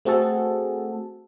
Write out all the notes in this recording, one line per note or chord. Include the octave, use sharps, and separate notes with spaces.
A3 C4 F#4 G#4 A4